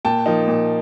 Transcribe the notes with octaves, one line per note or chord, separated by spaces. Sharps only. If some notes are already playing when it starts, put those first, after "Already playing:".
A#2 G5 A5
F3 A#3 D#4
A#2